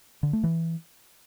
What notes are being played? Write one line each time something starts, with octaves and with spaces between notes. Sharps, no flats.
D3
A3
E3